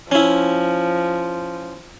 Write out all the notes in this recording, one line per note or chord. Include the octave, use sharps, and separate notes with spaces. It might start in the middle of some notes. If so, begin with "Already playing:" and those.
F3 C#4 E4